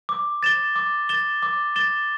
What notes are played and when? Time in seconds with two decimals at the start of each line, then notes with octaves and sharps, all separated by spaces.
0.09 D6
0.43 A6 E7 G7
0.76 D6
1.09 A6 E7 G7
1.43 D6
1.76 A6 E7 G7